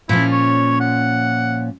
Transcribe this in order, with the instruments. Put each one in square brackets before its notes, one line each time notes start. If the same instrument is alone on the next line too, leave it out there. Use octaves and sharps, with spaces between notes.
[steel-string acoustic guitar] A#2 F3 C#4 [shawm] E4
[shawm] C#5
F#5